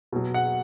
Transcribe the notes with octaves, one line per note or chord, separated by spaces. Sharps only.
B2 F#3
F#5